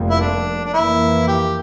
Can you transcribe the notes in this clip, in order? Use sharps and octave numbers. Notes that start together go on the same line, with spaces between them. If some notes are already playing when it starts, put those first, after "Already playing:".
Already playing: F1 F2 C3 G3 A#3
E4
D4
D4
F2 E3 A#3 E4
G4